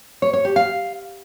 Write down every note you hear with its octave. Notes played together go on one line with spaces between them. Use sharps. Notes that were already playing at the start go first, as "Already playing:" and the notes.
C#5
C#5
G4
F5